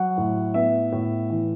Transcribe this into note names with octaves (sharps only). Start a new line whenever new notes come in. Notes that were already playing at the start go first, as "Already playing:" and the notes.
Already playing: F#3 F#5
A2
B3 E5
A2
E3